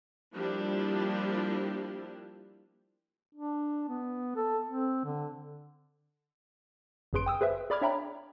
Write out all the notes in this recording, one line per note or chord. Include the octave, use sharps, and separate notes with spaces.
F3 G3 A#3 D4 E4 G4
D4
B3
A4
C4
D3
G1 F#2 G#4 B4 C6 D7
G5 D#6 E6
G#4 B4 C5 E5
G#4 D5 B5 D6 F6 G#6
D4 C#5 E5 G5 A#5 B5